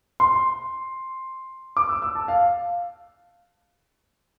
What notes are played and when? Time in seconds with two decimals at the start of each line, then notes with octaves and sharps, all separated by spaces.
0.20 C6
1.77 D6
1.89 E6
2.02 E6
2.15 A5
2.28 F5